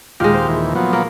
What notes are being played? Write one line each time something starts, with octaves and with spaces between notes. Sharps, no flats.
D#2 A#2 G#3 G4 F5
C5
D#2 E3
F3 F#3 B3
A#3